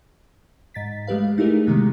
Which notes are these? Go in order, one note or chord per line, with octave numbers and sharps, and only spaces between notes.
G#2 A6 B6
G#3 A3 G4 B4 F5
A3 D#4 E4 G4 G#4 A#4
C3 D#3 G#3 A3 B3